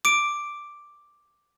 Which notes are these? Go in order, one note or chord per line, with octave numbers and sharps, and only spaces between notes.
D6 D7